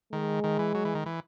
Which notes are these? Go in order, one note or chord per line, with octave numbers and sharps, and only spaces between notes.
D#3 G#3
D#3
E3
F#3
E3
D#3
E3